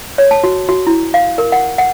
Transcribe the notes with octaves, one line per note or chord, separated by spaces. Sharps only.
C#5
A5
F#4
F#4
E4
F5
A#4
F#5
F#5